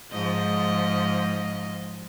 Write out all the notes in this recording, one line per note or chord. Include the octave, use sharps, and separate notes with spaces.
G#2 F3 D#5